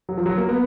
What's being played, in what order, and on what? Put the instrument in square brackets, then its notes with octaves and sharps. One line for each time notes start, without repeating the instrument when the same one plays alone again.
[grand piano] F#3
F3
F#3
A#3
B3